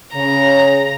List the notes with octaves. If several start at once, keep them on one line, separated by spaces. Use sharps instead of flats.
C#3 A#5